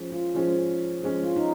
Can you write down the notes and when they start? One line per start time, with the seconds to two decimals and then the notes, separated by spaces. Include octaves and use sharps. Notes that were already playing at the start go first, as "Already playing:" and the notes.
Already playing: F3 G#3 C#4
0.12 F4
0.35 F3 G#3 C#4
1.02 F3 G#3 C#4
1.24 F4
1.36 D#4